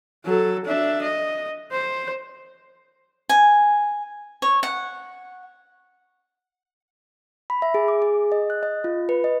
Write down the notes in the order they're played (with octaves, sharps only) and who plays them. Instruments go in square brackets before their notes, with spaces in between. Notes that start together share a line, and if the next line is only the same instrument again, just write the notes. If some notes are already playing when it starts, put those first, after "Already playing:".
[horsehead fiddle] F#3 A4
D4 E5
D#5
C5
[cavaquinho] G#5
C#5
F#5
[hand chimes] B5
E5
G#4
D6
G#4
D#5
F#6
D#5
F4
B4
D#5